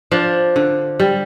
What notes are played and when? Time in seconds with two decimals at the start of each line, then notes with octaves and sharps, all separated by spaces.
0.11 F3 D4
0.56 D3
1.00 G3